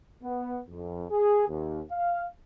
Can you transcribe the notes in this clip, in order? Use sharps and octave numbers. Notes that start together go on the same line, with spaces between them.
B3
F2
G#4
D#2
F5